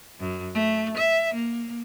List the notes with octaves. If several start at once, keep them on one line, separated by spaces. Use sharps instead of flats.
F#2
A3
E5
A#3